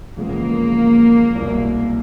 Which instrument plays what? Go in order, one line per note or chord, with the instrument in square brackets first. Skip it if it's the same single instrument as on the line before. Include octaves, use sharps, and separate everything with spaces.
[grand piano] E2 C#3 F3 G#3 B3 [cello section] A#3
[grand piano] C2 B2 G#3